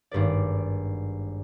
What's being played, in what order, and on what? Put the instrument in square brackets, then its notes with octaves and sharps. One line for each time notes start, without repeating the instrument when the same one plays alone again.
[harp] G#1 G2 B4 D5